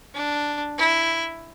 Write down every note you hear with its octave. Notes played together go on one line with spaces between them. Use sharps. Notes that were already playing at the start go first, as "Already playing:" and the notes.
D4
E4